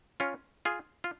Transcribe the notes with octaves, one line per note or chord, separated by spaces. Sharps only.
C#4 F4
F4 G#4
F4